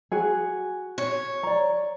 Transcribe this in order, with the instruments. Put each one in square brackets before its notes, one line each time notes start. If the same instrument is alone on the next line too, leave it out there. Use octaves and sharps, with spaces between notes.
[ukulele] F#4 G#4
[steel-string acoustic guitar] C#5
[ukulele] D5 A#5